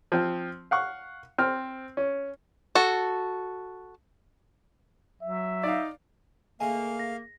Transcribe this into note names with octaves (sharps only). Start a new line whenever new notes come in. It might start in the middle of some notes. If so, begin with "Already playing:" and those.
F3 C4
F5 F#5 C#6
C4 F6
C#4
F#4 A4
F#3 E5
D#4 D5 F5
C#3 A3 A#3 D#5 F5 G#5
A#6